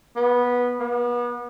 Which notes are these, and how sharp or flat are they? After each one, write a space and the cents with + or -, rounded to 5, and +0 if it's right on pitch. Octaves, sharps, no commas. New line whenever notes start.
B3 -15
B3 -35